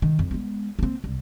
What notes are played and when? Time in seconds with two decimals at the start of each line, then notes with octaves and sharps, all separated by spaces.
0.02 D#3
0.19 F2
0.31 G#3 B3
0.79 A#3 C4
1.04 C2